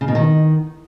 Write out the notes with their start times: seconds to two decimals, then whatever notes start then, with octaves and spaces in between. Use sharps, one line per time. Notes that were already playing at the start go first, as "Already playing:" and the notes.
0.01 C#3
0.08 B2
0.15 D#3